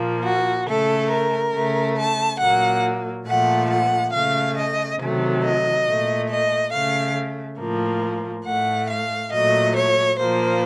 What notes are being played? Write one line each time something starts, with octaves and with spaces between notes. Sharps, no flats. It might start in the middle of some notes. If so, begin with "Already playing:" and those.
Already playing: A#2 F3 A#3
F#4
C#3 A3 A4
A#4
C#3 A3
A5
A#2 F#3 A#3 F#5
A#2 F3 A3 F#5
F#5
C#3 A3 F5
D#5
C3 D#3 F#3 A3
D#5
A#2 A3
D#5
C#3 A3 F5
A2 F3 A#3
A2 A3 F#5
F5
A#2 F#3 A3 D#5
C#5
A#2 F3 A#3 C5